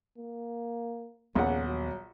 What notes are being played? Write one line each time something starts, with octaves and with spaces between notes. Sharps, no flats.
A#3
A#1 D#2 C#3 G3 B3 F#5
F#3